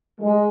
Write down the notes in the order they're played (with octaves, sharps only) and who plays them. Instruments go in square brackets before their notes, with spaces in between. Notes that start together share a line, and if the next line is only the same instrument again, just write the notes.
[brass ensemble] G#3